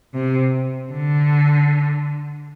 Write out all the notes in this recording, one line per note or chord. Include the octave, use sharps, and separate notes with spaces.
C3
D3